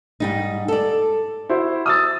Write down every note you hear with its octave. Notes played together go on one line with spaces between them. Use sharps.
G#2 G3 D#4
A4 D5
E4 F#4 C5
D#6 E6 A6